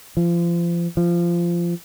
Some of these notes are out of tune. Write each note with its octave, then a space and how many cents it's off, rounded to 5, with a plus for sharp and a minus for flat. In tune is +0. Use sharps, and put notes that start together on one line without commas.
F3 -30
F3 -20